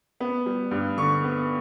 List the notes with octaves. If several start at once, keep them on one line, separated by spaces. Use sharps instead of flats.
B3
G3
G2
D3 C#6
B3